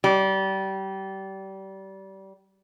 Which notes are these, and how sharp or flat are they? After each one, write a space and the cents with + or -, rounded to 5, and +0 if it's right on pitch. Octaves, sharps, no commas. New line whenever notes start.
G3 -25